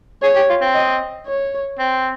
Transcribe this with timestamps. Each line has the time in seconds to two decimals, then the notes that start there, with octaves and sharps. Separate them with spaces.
0.23 G#4 C#5
0.36 G4
0.50 F4
0.61 C4
0.75 D#5
1.27 C#5
1.79 C4